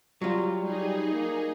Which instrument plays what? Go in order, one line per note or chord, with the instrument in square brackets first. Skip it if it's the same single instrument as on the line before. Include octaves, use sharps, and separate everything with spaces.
[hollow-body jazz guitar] F#3 F4 [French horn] G3
[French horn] G3 [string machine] D#4 G#4
[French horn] A#3